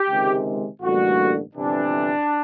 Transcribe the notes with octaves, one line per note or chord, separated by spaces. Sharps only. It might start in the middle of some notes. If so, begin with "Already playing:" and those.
Already playing: G4
C#2 C3 D#3 G#3
A1 G2 D3 G3 A#3 F#4
G1 F2 C3 E3 D4